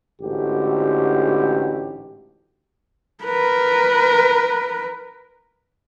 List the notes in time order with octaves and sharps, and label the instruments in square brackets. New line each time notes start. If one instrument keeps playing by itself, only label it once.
[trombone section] A1 G#2 D3 F#4 G4
[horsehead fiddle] A#4 B4